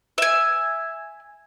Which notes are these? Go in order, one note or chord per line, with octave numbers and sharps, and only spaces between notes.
E5 G#5